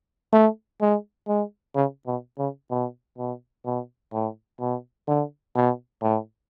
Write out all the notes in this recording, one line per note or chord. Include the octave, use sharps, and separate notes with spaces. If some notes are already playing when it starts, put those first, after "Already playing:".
A3
G#3
G#3
C#3
B2
C#3
B2
B2
B2
A2
B2
D3
B2
A2